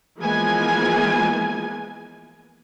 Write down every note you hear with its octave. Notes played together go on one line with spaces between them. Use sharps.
E3 F3 G#3 A#3 B3 G#5